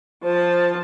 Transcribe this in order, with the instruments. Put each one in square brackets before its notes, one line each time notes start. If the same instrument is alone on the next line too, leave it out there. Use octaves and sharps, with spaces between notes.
[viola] F3 A5 [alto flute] C5